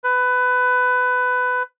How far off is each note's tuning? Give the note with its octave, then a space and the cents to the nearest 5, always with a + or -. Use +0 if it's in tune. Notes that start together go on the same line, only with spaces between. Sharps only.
B4 +20